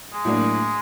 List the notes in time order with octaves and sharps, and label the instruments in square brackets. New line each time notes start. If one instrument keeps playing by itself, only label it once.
[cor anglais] G#3
[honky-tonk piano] A2 F#3 A#3 D4